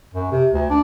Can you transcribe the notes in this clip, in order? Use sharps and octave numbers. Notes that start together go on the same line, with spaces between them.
F#2
C3
D2
D4